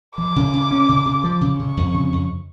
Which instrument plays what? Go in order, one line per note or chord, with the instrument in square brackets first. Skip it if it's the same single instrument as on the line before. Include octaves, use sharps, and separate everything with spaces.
[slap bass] F3 [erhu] D6
[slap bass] C#3
C#3
C#4
C#3
C#3
F3
C#3
[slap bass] C#3 [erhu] C#6
[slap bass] F2
C#3
F2